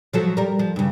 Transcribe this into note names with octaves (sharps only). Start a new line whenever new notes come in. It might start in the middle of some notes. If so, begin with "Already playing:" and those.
F3 F#3 A4
G3 A#4
F3
G2 C#3